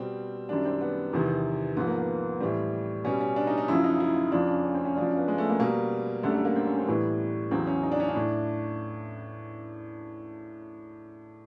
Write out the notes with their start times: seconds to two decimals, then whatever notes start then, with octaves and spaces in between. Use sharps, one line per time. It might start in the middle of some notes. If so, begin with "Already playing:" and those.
Already playing: B2 G3 C4
0.49 F#2 D#3 G3 D4
0.65 C4
0.81 B3
1.13 E2 C3 D#3
1.77 G#2 F3 B3
1.87 A#3
1.98 B3
2.40 A2 E3 G3 C4
3.04 B2 G3 C#4
3.21 C#4
3.36 D4
3.47 D#4
3.58 D#4
3.68 F#2 C#3 F3 E4
3.84 D#4
4.00 E4
4.16 D#4
4.32 F2 C#3 F3 D4
4.48 C#4
4.64 C#4
4.74 C4
4.85 C#4
4.96 F#2 C#3 F3 D4
5.07 C#4
5.17 B3
5.28 G#3
5.38 A3
5.49 A#3
5.60 B2 G3 A#3
6.23 F#2 D3 G3 A3
6.34 A3
6.45 A#3
6.56 C4
6.66 C#4
6.77 C4
6.87 A2 E3 G3 B3
7.51 E2 C#3 F#3 C4
7.67 C#4
7.83 D#4
7.92 D4
8.00 C#4
8.09 D4
8.15 A2